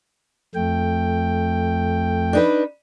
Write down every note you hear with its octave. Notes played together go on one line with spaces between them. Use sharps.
F2 A3 G5
D4 D#4 B4